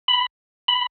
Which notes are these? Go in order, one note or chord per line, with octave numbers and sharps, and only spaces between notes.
B5
B5